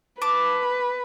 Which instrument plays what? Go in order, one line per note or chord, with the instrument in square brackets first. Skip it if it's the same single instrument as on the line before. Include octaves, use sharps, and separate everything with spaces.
[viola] B4 [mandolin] A5 D6